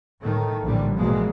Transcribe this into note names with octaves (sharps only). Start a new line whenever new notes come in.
A2 D#3 A3
A#1 A2 D3 E3 G3
A#1 G#2 B2 E3 G#3 A#3